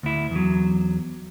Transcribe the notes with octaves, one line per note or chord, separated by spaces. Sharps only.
D2 E4
E2 F#3